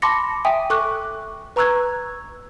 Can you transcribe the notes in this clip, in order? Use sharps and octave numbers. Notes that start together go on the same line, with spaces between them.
A5 B5 C6 D6 A#6 C#7
E5 G5 G#5 D#6
A4 C#6 D6 F#6
B4 A#5 C#6 E6 F#6 G#6